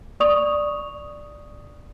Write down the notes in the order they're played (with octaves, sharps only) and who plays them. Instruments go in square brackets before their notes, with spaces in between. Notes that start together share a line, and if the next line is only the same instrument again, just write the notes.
[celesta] D5 C#6 D#6 F7